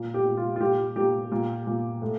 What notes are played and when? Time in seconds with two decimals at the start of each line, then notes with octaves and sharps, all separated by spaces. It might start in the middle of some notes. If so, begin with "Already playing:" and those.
Already playing: A#2
0.14 G4
0.25 A#2
0.37 F4
0.56 F4
0.61 A#2 G4
0.96 A#2 G4
1.32 A#2
1.67 A#2
2.02 A2